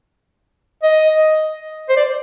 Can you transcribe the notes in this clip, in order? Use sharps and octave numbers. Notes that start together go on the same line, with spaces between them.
D#5
C5
D5